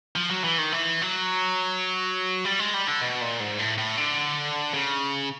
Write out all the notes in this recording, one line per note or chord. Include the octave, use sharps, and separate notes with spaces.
F3
F#3
E3
D#3
E3
F#3
G3
G#3
G3
D3
B2
A#2
G#2
A2
A2
D3
C#3